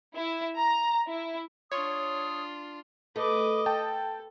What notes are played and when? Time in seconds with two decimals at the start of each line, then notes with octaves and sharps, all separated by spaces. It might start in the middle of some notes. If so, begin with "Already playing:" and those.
0.12 E4
0.58 A#5
1.09 E4
1.72 D4 F4 C#5 D#6
3.16 A3 B4 D#5 D6
3.66 A4 G5 A5